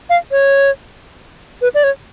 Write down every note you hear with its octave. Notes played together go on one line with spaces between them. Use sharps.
F5
C#5
B4
D5
C#5